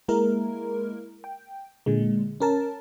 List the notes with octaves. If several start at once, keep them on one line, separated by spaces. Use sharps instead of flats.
G#3 A#3 E4 A#4
G5
A#2 D3 G#3
C#4 A#4 A5